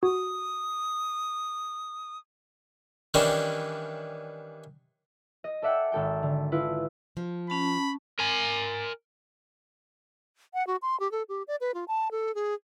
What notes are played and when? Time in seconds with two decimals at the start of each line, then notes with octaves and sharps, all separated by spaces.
0.03 F#4 D#6
3.14 D#3 E3 G3 C#4 D4 E4
5.44 D#5
5.62 A4 D5 E5 F#5 G5
5.92 G#1 A4 G5
6.23 D3
6.52 E4 F4 B4
7.17 F3
7.50 C#4 A5 B5
8.19 A#4 G#5
10.54 F#5
10.67 F#4
10.82 C6
11.00 G4
11.12 A4
11.29 G4
11.48 D5
11.61 B4
11.74 F4
11.88 A5
12.11 A4
12.35 G#4